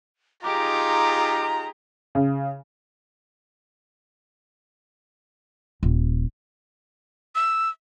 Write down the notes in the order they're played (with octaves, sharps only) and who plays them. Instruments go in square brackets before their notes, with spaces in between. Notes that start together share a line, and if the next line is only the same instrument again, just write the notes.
[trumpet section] D#4 F4 [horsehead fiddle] G4 G#4 [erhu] A#5 [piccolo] D6
[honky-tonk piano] C#3
[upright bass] D#1
[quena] E6